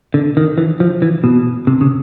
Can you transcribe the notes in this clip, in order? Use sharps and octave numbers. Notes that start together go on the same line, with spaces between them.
D3
D#3
E3
F3
E3
B2
C3
C#3